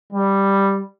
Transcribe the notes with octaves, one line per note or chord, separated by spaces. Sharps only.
G3